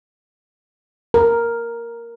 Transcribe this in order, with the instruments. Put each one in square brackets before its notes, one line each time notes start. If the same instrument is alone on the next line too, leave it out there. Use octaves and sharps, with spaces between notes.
[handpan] A#4